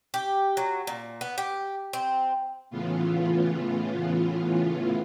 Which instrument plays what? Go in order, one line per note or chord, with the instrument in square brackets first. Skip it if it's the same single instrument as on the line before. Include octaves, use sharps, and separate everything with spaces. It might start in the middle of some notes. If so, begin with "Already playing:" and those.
[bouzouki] G4
F#3
A#2
B3
G4
C4
[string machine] A2 C#3 E3 B3 F4